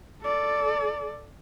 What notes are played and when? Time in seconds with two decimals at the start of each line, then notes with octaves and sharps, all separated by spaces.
0.21 A4 D5